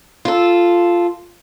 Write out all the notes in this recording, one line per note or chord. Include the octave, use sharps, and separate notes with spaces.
F4 A4